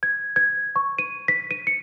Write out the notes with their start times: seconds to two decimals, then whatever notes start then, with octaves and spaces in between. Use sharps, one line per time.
0.03 G#6
0.36 G#6
0.76 C#6
0.99 D#7
1.28 B6
1.51 D#7
1.67 C#7